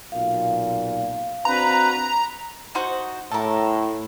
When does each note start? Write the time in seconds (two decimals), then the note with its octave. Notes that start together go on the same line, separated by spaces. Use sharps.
0.12 B1 A#2 F5
1.45 C4 D4 F#4 B4 A#5
2.75 D#4 F#4 C5
3.31 A2 A4 A#4